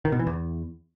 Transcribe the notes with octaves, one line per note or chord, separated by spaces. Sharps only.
D#3
B2
E3
E2